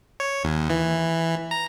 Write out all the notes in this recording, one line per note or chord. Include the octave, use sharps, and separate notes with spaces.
C#5
D#2
E3
A#5